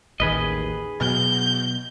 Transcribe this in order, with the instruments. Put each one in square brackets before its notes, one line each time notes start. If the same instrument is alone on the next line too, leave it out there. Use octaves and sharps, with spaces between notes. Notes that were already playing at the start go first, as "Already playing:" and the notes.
[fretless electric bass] A1 D#2 D#3 [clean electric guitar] G#4 B4 D#5
[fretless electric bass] B2 F#3 [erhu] G6